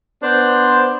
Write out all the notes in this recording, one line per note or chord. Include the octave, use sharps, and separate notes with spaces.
B3 D4 C5